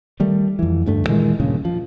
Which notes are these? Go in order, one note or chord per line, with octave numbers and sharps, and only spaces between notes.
D#3 G3 A3
F2 E3
D2 G2 A3
A#2 D#3 E3 G#3
D#1 G2 A#2 C#3
F3